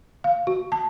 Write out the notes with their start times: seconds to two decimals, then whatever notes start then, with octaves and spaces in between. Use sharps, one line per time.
0.24 F5
0.47 F#4
0.72 A5